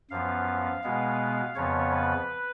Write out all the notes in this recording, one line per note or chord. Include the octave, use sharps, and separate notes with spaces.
F#2 F3 B3 F5
B2 G#3 B3
F2 C#3 F3 B3 C#5
B4